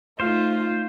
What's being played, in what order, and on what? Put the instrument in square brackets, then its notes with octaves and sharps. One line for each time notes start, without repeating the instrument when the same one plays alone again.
[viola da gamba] A3 D#4 [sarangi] F4 [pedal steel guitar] C5 F5